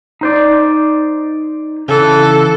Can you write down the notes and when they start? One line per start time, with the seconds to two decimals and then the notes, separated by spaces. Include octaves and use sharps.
0.21 D#4 C5 D5
1.88 C#3 E3 A4